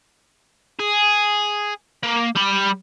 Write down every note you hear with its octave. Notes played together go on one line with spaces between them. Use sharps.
G#4
A#3
G3 B5